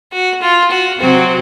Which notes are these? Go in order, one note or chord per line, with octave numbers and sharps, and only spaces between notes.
F#4
F4
F#4
C3 F#3 C4 F#4